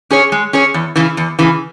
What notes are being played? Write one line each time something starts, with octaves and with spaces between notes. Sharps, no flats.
C#4 G#4 C#5
G#3
C#4 G#4 C#5
E2
C#3 E3
E2
C#3 E3